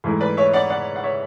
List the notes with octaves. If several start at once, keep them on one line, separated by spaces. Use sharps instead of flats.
G#2 E3 A3
B4 D5
C#5 E5
D5 F#5
D5 F#5
F#5
C#5 E5